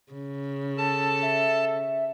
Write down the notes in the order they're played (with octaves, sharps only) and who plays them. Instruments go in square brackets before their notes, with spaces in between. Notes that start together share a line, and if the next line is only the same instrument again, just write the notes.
[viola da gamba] C#3
[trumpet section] A4 [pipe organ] A5
[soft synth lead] E5